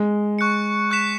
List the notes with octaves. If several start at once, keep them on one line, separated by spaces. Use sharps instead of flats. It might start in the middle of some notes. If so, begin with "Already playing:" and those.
Already playing: G#3
C#6 F#6 C#7
C#6 F#6 B6 E7